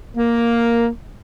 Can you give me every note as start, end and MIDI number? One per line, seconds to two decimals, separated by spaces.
0.17 0.87 58